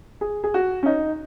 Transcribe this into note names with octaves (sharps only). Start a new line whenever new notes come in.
G#4
G#4
F#4
C#4
D#4